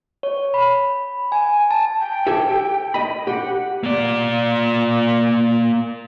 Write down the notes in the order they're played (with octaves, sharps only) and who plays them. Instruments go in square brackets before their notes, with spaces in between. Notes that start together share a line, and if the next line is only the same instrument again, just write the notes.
[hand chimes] C#5
B5
G#5
A5
[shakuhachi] G5
[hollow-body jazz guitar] G4 A4 G#5
D#5 B5
[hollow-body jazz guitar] G4 [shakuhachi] F#5
[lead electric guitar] A#3 D5